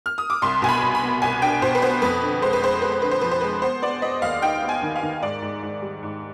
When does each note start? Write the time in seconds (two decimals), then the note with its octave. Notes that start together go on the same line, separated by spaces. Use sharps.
0.06 F6
0.18 D#6
0.30 D6
0.42 C2 C6
0.62 B2 G#5
0.69 B5
0.82 C2
0.95 B5
1.02 B3
1.22 C2 G#5
1.42 D4 G5
1.62 B2 C5
1.75 B4
1.82 B3 C5
2.02 F2 B4
2.22 D3
2.42 G#3 C5
2.53 B4
2.62 G#3 C5
2.82 G#3 B4
2.92 C5
3.02 D3 B4
3.11 C5
3.21 F3 B4
3.31 C5
3.41 G#3 B4
3.62 B3 C5
3.82 B3 D5
4.02 B3 D#5
4.22 D#2 F5
4.42 D#4 G5
4.62 B3
4.69 G#5
4.82 D#3
4.96 F5
5.02 D#3
5.22 G#2 D5
5.42 G#2
5.63 G#2
5.82 G3
6.03 G#2